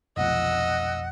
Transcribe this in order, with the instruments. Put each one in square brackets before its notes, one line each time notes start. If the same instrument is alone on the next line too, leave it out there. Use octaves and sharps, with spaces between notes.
[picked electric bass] F1 B1 F2 [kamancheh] D#5 E6 [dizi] F#5